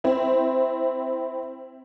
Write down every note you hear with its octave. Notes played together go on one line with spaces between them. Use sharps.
C4 E4